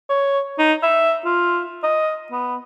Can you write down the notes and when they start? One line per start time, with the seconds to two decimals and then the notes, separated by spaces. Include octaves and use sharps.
0.10 C#5
0.59 D#4
0.83 E5
1.25 F4
1.83 D#5
2.32 B3